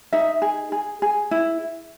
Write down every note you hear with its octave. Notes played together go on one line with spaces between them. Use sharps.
D#4 E5
G#4
G#4
G#4
E4